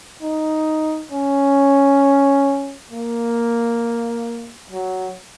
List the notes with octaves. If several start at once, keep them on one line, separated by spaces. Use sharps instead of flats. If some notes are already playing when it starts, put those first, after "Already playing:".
D#4
C#4
A#3
F#3